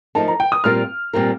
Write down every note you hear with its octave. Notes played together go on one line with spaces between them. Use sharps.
F3 A3 D#4 A#4 A5
A#5
G5
D#6
A#2 G3 C4 F4 A#4 F6
A#2 G3 C4 F4 A#4